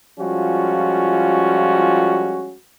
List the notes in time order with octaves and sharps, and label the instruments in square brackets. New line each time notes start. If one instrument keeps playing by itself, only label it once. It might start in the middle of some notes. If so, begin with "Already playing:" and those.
[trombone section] F3 G3 G#3 C#4 F4 F#4